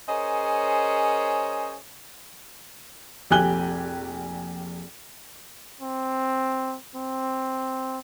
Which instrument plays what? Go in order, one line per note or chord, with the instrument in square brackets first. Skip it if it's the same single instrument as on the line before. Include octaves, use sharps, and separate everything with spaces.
[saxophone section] C#4 G#4 A#4 C5 C#5 D#5
[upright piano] F1 A#1 G4 G#5 F#6 G7
[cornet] C4
C4